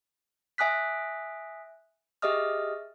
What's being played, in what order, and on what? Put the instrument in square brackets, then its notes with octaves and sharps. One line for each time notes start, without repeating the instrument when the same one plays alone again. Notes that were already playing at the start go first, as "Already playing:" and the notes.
[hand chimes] E5 G#5 D#6 F#6 B6
G4 G#4 D#5 E5 D#6 F6